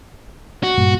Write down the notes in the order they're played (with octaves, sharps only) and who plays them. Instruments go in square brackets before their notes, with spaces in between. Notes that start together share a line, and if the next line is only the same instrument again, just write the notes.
[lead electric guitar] F#4
[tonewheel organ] G2 A#2